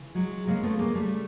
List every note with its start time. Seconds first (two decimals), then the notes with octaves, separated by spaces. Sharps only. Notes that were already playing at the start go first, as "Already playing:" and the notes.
Already playing: C#3 E3
0.15 F#3 G#3
0.47 C#3 F#3 G#3 A#3
0.63 A3 B3
0.79 G#3 A#3
0.95 G3 A3